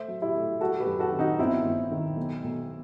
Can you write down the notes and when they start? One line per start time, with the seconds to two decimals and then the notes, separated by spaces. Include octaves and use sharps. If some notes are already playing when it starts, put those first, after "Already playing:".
Already playing: A3 C5 E5
0.08 F#3
0.22 E4 G4
0.35 A3
0.61 G3 F#4 A4
0.80 G4 B4
0.87 F#2
0.99 F#4 A4
1.12 D#3
1.19 D#4 F#4
1.39 G1 C4 E4
1.65 G1
1.91 D#3
2.17 B1
2.44 B1